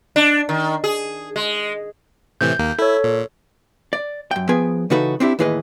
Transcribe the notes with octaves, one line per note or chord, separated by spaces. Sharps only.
D4
D#3
G#4
G#3
A2 C3 E3 G6
D#2 A#3
E4 A4 C#5
A#2
D5
F#2 G5
F3 B3 G#4 B4 G5 G#5
C#3 E3 D#4 F#4 A4 B4
C4 D4 E4 G4
D#2 A2 E3 G#4 B4 D#5